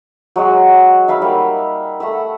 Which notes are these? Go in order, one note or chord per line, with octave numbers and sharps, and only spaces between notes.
F#3 G#3 F#4
D#4 E5 F5 B5
G3 A#3
A3 F#5 B5 E6